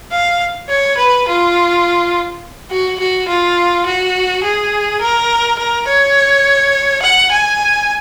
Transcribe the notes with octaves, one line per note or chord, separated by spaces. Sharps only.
F5
C#5
B4
F4
F#4
F#4
F4
F#4
G#4
A#4
A#4
C#5
F#5
G#5